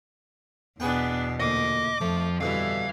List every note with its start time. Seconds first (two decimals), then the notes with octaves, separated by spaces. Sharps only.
0.80 E2 B2 B3 D4 G#4 B4 G5
1.40 D2 A#2 D#5 D6
2.01 F2 F3 A3
2.41 G2 B2 D3 E3 E4 F5